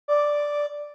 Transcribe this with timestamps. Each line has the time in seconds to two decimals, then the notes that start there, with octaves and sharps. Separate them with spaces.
0.08 D5